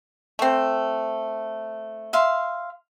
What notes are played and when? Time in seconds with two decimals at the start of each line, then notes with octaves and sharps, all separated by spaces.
0.39 A3 C4
2.13 E5 F5 C6